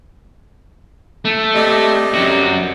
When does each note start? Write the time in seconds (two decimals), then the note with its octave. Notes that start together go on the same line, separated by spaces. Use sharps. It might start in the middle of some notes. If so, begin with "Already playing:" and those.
1.25 A3
1.55 C3 G3 D#5
2.14 F#2 F#4